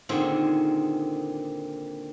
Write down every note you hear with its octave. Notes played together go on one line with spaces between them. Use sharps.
A#2 D3 D#3 C4 G#4